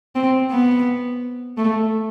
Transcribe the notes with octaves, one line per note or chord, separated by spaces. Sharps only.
C4
B3
A3